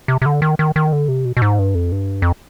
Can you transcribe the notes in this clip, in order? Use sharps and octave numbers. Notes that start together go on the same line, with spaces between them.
C3
C3
D3
D#3
D#3
D#3
D3
C3
B2
B2
G#2
G2
F2
G2
F2